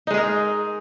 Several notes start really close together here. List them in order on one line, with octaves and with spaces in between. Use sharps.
D#4 G#3 G#4 A#4